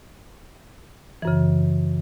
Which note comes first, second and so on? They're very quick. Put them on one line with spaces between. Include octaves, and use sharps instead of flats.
E3 F#2 C#3